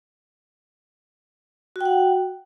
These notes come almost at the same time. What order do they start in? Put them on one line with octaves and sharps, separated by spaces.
F#4 G5 F#5